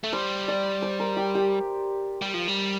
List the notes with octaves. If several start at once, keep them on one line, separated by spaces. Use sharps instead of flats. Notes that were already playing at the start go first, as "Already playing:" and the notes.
A3
G3 C5
D5
C5
A#4
G4
G4
G3
F3
G3